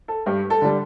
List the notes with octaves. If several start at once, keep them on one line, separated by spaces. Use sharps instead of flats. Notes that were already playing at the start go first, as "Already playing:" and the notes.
A4
G2 G4
A4
D3 G3